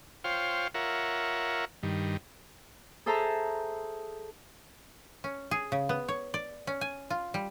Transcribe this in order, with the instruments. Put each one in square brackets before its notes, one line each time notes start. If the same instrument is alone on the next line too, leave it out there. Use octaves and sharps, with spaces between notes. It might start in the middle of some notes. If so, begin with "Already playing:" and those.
[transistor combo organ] F4 C5 C#5 F5 G5
F4 A#4 C#5 E5 F#5
G2 D#3
[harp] G#4 A4 C5 E5 A5 A#5
[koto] C#4
G#4
C#3
B3
C#5
D5
C#4
G#5
F4
G3